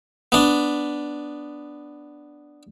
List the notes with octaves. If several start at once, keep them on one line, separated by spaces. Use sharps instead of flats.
B3 D4